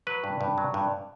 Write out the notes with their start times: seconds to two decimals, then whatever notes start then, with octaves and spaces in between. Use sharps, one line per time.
0.07 F#3 B4
0.24 G2
0.41 G2
0.58 F#3
0.74 G2